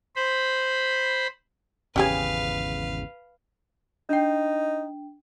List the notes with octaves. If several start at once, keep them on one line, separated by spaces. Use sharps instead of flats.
C5 B5
G#1 E2 C#3 C#4 G4 G#4 B4 F5
D4 D#4 G5